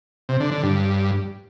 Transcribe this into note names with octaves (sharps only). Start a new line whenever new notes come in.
C3
D3
D3
G2